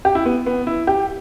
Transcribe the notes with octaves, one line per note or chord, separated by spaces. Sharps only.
G4
E4
B3
B3
E4
G4